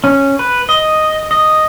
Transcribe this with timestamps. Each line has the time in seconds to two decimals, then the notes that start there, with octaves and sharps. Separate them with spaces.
0.04 C#4
0.39 B4
0.69 D#5
1.31 D#5